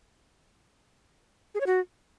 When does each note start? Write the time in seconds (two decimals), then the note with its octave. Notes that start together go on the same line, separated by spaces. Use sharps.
1.55 G#4
1.61 C#5
1.66 F#4